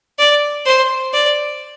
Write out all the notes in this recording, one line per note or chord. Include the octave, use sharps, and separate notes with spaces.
D5
C5
D5